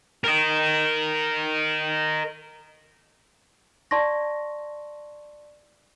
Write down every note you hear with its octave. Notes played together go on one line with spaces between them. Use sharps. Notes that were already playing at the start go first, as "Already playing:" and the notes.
A#4 D#5
D5 A5 C6 C#6 A#6